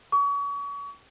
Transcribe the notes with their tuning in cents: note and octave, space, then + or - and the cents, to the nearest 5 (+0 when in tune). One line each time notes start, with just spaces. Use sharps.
C#6 +35